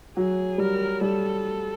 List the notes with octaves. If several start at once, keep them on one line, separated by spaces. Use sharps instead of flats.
F#3 G#4
G3 A#4
G3 A4